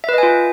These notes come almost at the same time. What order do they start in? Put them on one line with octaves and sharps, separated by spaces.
E5 B4 D#5 G#5 F4